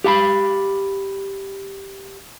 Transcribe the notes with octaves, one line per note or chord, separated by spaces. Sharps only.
G4 F5 A#5 B5